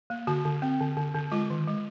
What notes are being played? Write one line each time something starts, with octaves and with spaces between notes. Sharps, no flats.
A#3
D3 F#4
D3
C4
D3
D3
D3
G#3 F4
D#3
G#3